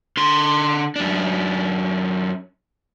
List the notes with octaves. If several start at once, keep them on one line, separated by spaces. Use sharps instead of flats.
D3 C6
F#2 D4